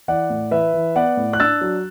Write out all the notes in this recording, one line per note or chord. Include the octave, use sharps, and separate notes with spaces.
E3 D5 F#5
A2
E3 B4 E5
E3
B3 D5 F#5
A2
F#6
D4 E6 A6
F#3